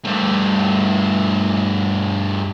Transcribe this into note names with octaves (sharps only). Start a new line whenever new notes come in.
G2 A3